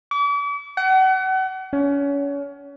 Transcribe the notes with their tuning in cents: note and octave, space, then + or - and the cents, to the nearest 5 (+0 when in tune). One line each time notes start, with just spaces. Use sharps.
D6 -40
F#5 +35
C#4 +30